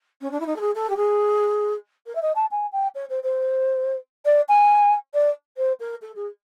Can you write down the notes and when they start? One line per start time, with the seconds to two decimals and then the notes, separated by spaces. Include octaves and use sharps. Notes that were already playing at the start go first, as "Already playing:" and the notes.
0.21 C#4
0.31 D4
0.40 E4
0.46 D#4
0.56 A4
0.60 G#4
0.75 A4
0.89 G4
0.96 G#4
2.06 A#4
2.15 E5
2.22 D#5
2.35 A5
2.51 G#5
2.72 G5
2.95 C#5
3.09 C5
3.23 C5
4.25 D5
4.48 G#5
5.14 D5
5.57 C5
5.80 A#4
6.01 A4
6.15 G#4